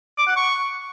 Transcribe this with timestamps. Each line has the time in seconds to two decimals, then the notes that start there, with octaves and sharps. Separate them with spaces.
0.18 D6
0.27 F#5
0.36 C#6